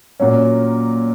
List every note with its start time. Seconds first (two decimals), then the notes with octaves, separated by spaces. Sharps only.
0.20 A#2 F#3 C#4